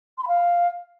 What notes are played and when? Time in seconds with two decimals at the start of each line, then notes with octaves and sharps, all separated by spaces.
0.18 C6
0.23 B5
0.28 F5